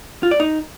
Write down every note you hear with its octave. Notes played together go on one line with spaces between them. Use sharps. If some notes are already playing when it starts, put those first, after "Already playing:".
F4
D5
D#4